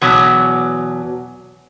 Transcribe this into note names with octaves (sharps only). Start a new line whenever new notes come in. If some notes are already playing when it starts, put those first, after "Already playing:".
E2 B2 F#3